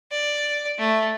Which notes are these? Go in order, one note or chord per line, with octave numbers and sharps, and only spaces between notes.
D5
A3